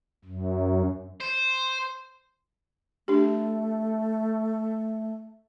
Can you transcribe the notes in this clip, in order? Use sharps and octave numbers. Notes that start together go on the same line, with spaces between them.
F#2
C5
A3 D4 G4